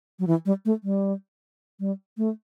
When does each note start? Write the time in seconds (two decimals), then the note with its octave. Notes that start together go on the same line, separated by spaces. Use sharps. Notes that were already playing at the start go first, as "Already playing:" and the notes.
0.19 F#3
0.27 E3
0.46 G3
0.65 A3
0.84 G3
1.80 G3
2.18 A3